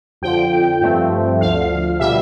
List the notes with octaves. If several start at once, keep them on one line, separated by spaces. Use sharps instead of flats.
F2 D3 F3 G5
G2 F3 A3 C4
D2 D3 F3 F5
B2 G3 E5